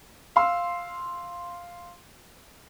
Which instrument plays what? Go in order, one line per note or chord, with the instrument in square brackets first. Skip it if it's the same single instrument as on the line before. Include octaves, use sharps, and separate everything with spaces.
[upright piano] F5 C6 E6